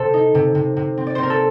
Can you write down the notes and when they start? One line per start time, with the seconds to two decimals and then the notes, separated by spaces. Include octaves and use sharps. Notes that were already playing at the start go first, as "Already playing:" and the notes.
Already playing: C3 C4 A4 C5
0.14 D#4
0.35 C3
0.55 C3
0.77 C3
0.98 C4
1.07 D5
1.15 C4 C5
1.23 A#4
1.30 A4